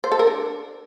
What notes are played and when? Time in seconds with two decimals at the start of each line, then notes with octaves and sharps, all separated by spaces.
0.04 C5
0.12 A4
0.19 A#4
0.27 D4